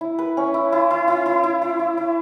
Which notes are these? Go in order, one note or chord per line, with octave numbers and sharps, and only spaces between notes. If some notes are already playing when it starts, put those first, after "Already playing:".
E4
B4
C#4
E4
E4
E4
E4
E4
E4
E4
E4
E4